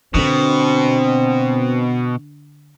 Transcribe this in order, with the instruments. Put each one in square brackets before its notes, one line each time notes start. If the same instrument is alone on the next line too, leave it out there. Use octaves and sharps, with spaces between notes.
[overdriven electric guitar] B2 [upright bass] D3 D4 [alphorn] C4